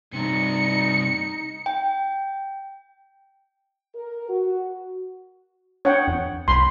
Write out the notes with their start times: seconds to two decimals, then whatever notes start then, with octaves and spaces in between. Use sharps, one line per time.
0.13 G2 C3 D#4 C#7
1.66 G5
3.95 A#4
4.29 F#4
5.85 D4 C#5 F#5 G5
6.08 F2
6.48 C2 B5 C6